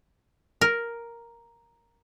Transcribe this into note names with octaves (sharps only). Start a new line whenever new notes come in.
A#4